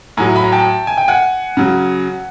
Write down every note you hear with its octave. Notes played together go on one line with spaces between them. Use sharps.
A2 F#3 G#5 A#5
B5
A#5
G5 A5
G#5
G5
F#5 G#5
C#3 F#3